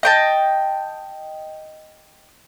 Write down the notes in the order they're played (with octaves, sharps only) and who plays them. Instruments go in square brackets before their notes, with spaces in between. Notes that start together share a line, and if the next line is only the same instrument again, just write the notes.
[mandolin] D#5 G5 A5